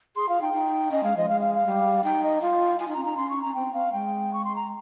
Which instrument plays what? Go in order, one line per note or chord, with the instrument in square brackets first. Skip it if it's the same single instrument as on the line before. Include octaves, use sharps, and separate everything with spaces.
[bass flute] G#4 [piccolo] C6
[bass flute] F4 [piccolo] F5
[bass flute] D#4 [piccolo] G5
[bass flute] D#4
[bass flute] C#4 [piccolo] D#5
[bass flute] G#3 [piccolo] F5
[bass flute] F3 [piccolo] D#5
[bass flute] G#3 [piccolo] F5
[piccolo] F5
F5
[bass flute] G3
[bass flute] D#4 [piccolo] G5
[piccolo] D#5
[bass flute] F4 [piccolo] F5
[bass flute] F4 [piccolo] G#5
[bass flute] D#4
[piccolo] A#5
[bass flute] C#4
[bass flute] D#4 [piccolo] A#5
[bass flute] C#4 [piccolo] C6
[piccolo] C#6
[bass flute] C#4 [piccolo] A#5
[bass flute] C4 [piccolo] G5
[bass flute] C4 [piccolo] F5
[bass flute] G#3 [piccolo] G5
[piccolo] C#6
C6
A#5